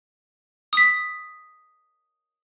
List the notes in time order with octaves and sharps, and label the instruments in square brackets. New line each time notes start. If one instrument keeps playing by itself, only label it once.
[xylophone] D#6 B6